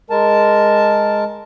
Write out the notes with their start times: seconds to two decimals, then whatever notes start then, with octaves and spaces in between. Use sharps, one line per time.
0.10 G#3 A#4 A5